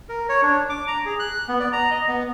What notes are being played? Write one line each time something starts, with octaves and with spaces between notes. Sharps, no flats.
A#4
C#5
D4
D6
A#5
G#4
F#6
B3
D5
A#5
D#5
B3